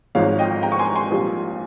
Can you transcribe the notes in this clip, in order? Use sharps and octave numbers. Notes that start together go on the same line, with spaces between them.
G#1 G#2 F3 G#3 C#5 F5
D#5 G5
G5 A#5
C#6
G#5 C6
G#5 C6
A#1 A#2 G3